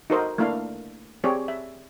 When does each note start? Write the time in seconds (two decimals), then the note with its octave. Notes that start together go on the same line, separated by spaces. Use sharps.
0.10 D#4 F#4 A4 A#4 C5 D#5
0.38 A3 A#3 D4 E4 F5
1.24 C4 G4 G#4 C#5 D5
1.48 E5